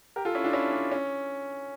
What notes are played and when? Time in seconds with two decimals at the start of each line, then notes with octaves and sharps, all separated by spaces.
0.16 G4 A#4
0.25 F4 A4
0.35 C#4 E4
0.44 D4 F4
0.53 C#4 E4
0.72 D4
0.91 C#4